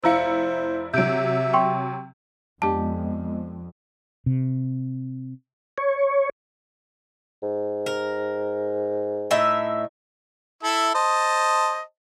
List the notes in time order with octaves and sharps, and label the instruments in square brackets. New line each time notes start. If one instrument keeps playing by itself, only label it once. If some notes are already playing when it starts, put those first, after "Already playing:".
[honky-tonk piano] F1 E4 C#7 [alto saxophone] C5 [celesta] F5 A#5 E6
[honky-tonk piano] C3 F#3 [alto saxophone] E5 [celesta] G6 D7
[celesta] G5 C6 C#6
[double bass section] F2 [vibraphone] G#3 B3 D#5 [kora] D4 G4 [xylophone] A5
[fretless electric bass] C3
[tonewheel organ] C#5
[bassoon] G#2
[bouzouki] A#4
A2 D#4 E5
[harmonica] E4 A4 E5
C5 D#5 A5